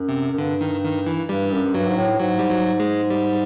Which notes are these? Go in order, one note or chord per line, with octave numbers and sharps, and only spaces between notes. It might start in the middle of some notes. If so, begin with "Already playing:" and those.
Already playing: F#2
C3
F#2
G2 D3
D#3
D#3
E3
G2 G3
F#2
G2 F#3
G#2
A2
G#2 F#3
G3
F#3
G#3
G3